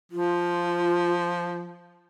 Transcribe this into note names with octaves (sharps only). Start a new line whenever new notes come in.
F3 F4